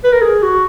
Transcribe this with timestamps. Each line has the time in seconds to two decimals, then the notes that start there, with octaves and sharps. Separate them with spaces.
0.04 B4
0.13 A#4
0.22 G#4
0.42 F#4